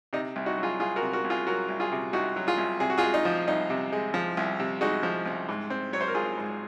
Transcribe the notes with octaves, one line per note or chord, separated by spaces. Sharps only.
C3 D#4
C2
D#4 F#4
F#3
F4 G#4
C2 F4 G#4
F#4 A#4
C3
F#4 A#4
C2
F4 G#4
F#3 F#4 A#4
C2
F4 G#4
C3
C2 D#4 F#4
F#3
F4 G#4
C2
C3 G#4
F#4
F4 G#4
G#3
D#4
F3
C2 D#4
C3
G#3
F3
C2
C3
G#3 D#4 F#4
F3
C2
G#2
C4
F#3 C#5
C5
A#4
G#1 F4 G#4
G#2